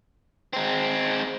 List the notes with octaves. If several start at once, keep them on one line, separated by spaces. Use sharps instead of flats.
G#3 C4